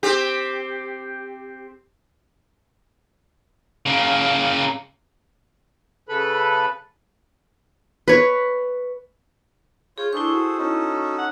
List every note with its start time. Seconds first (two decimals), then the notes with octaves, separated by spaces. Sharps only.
0.03 C4 G4
3.86 C#3 A#3
6.09 C#3 A4 B4 B5
8.08 B4 C#5
9.98 F4 G#4 C#5 G6
10.13 D4 E4 G#4 A4 C5 C#6
10.32 F#4
10.58 C#4 D#4 A4
11.18 F#5